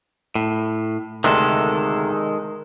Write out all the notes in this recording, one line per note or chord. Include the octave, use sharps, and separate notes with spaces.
A2
D2 C3 D#3 G#3 A4